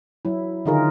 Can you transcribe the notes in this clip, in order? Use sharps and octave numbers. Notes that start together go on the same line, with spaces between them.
F#3 E4
D3 D#3 D#4 F4 G#4 A#4